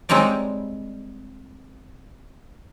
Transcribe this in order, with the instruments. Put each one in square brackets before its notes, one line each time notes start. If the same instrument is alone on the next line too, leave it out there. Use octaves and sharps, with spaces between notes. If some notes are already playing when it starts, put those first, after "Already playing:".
[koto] G3 G#3 C4 D#4 C#5 D5